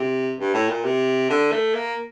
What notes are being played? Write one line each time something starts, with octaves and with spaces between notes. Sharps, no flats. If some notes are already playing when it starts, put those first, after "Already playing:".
Already playing: C3
G2
A2
A#2
C3
D3
A3
A#3